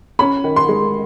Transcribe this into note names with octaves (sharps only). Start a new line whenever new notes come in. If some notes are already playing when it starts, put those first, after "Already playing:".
C#4 B5
D#3
C6
G#3